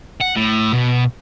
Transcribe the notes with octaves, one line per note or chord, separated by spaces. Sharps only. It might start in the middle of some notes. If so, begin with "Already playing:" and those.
F#5
A2
B2